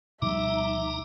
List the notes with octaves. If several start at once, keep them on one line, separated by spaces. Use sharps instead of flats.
D2 B2 F3 G3 D#4 E5 A#5 D6